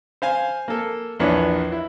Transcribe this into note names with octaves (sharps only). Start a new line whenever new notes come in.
C5 F5 G#5
A#3 A4
A#1 E2 D4 B4 C#5
E4